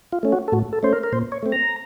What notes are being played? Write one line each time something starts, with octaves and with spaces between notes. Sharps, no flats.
F4
A3 C#4
F#4
A4
A2 F#4
A4
A3 C#4 C5
A#4
A#4
A#2 C5
C#5
A3 C4
A#5